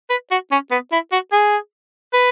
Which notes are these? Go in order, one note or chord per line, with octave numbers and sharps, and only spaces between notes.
B4
F#4
C#4
B3
E4
F#4
G#4
B4